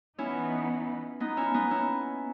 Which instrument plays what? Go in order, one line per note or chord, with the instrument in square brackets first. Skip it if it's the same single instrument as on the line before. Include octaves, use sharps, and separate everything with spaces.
[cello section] E3 B3 D#4 [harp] C#4 E4
[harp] B3 D#4
C#4 E4
B3 D#4
C#4 E4